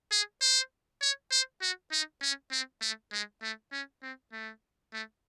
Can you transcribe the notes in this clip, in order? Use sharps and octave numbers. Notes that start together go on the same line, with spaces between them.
G#4
C5
C#5
C5
F#4
D#4
C#4
C4
A3
G#3
A3
C#4
C4
A3
A3